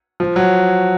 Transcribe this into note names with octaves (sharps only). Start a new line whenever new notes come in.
F3
F#3